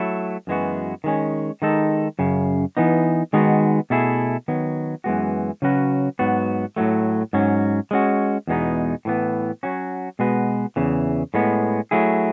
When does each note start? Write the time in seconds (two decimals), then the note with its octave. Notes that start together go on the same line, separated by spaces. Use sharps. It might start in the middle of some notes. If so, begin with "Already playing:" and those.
Already playing: F#3 A3 E4
0.47 F#2 E3 G#3 B3 F#4
1.04 D#3 G#3 C#4
1.62 D#3 G#3 D#4 A4
2.19 F#2 C#3
2.77 E3 B3 D#4
3.33 D#3 G#3 B3 D#4 F#4
3.90 B2 A3 E4 G#4
4.48 D#3 F#3 B3
5.04 F#2 E3 G#3 B3 F#4
5.62 C#3 F#3 C#4 F#4 B4
6.19 G#2 F#3 B3 F#4
6.76 A2 F#3 A3
7.33 G#2 F#3 C#4
7.91 G#3 C#4 F#4
8.47 E2 B2 G#3 B3 D#4
9.05 A2 E3 B3
9.63 F#3 C#4 F#4
10.19 B2 G#3 B3 F#4 B4
10.76 E2 C#3 E3
11.34 A2 G#3 B3
11.91 F#3 A3 E4 G#4